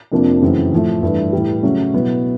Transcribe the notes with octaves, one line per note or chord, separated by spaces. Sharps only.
F2 C3 F3 A#3 D4
F#2 C#3 E3 A3 C4
A2 F3 A3
G2 E3 A3
A2 E3 G3
C#3 F#3 A3 C#4
B2 F#3 B3 E4